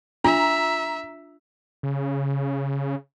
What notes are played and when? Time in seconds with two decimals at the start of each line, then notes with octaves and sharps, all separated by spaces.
0.24 D4 F4 E5 A#5
1.83 C#3